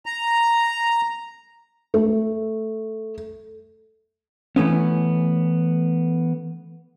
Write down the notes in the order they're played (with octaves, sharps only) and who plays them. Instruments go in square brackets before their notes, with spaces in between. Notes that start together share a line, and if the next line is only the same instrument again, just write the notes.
[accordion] A#5
[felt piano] A3
[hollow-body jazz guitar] E3 A3 B3 C#4